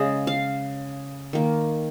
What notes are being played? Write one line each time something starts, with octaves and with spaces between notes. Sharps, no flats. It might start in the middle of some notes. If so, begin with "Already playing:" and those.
Already playing: C#3 G#3 D#5 F5
F5
D#3 A#3